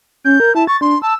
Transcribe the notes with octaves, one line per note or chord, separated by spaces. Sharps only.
C#4 G6
A#4
E4 A5
C#6 A6
D4 C6
A5 E6